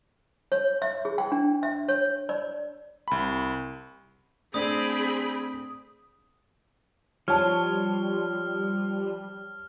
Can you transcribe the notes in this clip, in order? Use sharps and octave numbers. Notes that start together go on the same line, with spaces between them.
C#5
E5
G#4
G5
D4
E5
C#5
D5
C2 B5
A3 C4 D4 G#4 B5 D#6
F3 G3 C#5 A5 F6